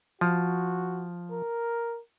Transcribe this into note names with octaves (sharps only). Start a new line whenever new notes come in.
F3 F#4
A#4